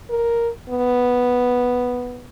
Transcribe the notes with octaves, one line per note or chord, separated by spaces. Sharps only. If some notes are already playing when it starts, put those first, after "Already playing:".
A#4
B3